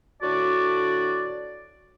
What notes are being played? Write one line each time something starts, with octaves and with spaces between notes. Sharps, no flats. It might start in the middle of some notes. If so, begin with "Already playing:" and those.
A2 D3 F#4 D5